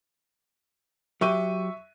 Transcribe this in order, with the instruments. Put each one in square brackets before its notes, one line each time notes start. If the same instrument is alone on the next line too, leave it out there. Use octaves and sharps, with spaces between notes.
[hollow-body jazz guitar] F#3 G4 [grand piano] E5 C#6 D#7